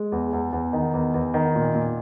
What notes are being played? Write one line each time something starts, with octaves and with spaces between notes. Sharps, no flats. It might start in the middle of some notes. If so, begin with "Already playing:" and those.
Already playing: G#3
E2
E2
E2
D#3
E2
E2
D#3
A#2
A#2